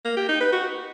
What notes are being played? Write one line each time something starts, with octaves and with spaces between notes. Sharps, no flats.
A#3
G4
D#4
B4
F#4